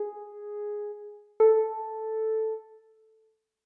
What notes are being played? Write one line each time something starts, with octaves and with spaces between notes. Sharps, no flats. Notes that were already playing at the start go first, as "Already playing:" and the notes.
Already playing: G#4
A4